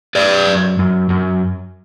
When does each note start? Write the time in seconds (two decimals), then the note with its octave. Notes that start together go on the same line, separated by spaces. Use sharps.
0.15 F#2 B4 D5
0.47 F#2
0.79 F#2
1.10 F#2